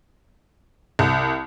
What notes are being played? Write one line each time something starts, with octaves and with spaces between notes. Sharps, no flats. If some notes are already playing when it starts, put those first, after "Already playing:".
C2